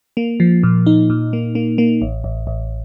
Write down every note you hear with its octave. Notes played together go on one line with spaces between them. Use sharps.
A#3
F3
A#2
D#4
A#2
A#3
A#3
A#3
A1
A1
A1